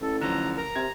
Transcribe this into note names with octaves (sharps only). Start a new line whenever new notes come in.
A1 A4
D3 F3 F#3 A#5
A#4 A#5
C3 G#6